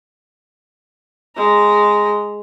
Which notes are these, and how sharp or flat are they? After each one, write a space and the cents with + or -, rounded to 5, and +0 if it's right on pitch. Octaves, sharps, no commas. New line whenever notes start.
G#3 +0 A#5 +0